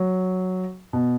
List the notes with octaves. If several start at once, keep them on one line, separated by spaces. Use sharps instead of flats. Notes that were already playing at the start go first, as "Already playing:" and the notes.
Already playing: F#3
B2